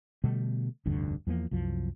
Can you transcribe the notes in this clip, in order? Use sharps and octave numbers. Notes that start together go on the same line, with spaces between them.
B2 D3 G3 A3
F1 D2 G2 D3
E2 F3 G#3 A#3
C2 F#2 F3